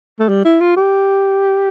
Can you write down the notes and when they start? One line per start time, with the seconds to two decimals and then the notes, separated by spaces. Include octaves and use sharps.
0.20 A3
0.29 G3
0.45 E4
0.61 F4
0.77 G4